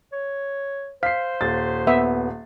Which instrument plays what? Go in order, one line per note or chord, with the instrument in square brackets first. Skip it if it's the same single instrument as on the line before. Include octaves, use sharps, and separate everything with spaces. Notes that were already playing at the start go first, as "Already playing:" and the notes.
[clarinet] C#5
[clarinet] C5 [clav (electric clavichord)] F5 [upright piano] B6 C7
[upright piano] D#1 A6
[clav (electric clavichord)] B3 [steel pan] E5